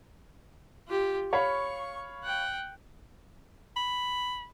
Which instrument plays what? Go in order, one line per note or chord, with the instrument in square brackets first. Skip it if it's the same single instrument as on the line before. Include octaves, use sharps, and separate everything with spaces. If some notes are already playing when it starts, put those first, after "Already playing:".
[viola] F4 G4
[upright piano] C#5 F5 B5 [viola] C#6
[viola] F#5 G5
[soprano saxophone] B5